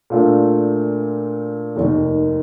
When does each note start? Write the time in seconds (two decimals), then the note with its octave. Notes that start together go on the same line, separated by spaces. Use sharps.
0.10 A#2 A3 D4 F4 A#4
1.76 F1 D#2 D#3